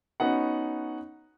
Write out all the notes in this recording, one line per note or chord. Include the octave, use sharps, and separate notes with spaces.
B3 C#4 D#4 F#4 F#5